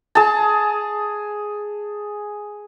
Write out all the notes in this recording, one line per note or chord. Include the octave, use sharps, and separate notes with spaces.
G#4 A5